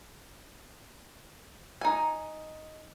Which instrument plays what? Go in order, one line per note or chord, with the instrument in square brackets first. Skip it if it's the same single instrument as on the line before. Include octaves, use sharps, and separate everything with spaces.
[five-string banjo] D#4 G#5